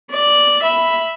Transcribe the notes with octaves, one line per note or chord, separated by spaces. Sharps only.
D5
E5 B5